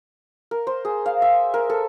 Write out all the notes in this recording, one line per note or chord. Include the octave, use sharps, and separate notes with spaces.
A#4
C5
G#4
F5
E5
A#4
A4